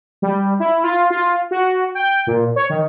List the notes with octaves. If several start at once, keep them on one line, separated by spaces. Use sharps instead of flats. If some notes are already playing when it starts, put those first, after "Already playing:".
G3
E4
F4
F4
F#4
G5
A#2
C#5
D#3